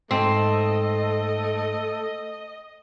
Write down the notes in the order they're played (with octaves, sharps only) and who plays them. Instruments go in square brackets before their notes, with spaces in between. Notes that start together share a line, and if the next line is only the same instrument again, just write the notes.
[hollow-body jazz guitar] G#2 [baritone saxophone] A3 [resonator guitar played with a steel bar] C4 [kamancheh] D#5